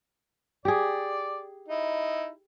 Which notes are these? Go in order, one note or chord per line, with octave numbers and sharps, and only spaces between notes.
G4 G#4 D5
D#4 E4